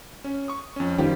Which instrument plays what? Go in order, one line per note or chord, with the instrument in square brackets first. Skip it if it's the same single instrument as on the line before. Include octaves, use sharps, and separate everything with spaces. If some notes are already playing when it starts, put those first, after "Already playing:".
[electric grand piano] C#4
C#6 D#6
F2 C#4
[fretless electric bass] F#2 D#3 F3 [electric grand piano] G3 G4